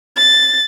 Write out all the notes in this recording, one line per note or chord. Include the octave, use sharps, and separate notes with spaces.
A6